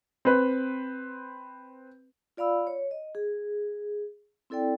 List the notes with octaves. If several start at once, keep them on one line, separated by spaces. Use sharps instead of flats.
C4 B4
F4 D5 F5 B5 E6
C#5
D#5
G#4
C4 E4 A4 D5 G5